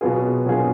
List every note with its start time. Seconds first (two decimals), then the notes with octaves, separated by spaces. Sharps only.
0.01 B2 F#3 B3 F4 G#4
0.45 B2 F#3 B3 F4 G#4